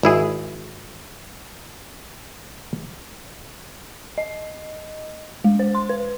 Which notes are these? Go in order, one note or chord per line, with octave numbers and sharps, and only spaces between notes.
G#1 E4 G#4
D#5
G#3
C5
C6
B4